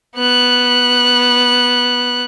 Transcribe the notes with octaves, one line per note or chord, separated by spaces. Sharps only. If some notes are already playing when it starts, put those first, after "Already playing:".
B3 F#6